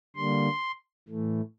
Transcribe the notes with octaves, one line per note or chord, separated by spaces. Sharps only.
D3 G3 A#3 C6
A2 E3 A3